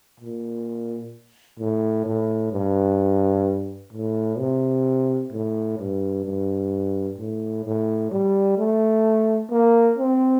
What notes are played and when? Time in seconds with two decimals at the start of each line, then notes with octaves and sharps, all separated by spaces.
0.20 A#2
1.59 A2
2.06 A2
2.52 G2
3.93 A2
4.38 C3
5.32 A2
5.79 G2
6.25 G2
7.18 A2
7.65 A2
8.11 G3
8.58 A3
9.51 A#3
9.98 C4